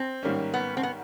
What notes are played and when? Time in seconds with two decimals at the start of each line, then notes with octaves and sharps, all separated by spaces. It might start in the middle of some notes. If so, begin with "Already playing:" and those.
Already playing: C4
0.23 G#2 D#3 G3 A#3 C#4
0.54 B3
0.77 C4
0.83 B3